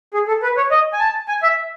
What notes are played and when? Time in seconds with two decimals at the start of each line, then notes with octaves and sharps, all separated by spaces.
0.14 G#4
0.28 A4
0.43 B4
0.57 C#5
0.71 D#5
0.93 G#5
0.99 A5
1.28 G#5
1.43 E5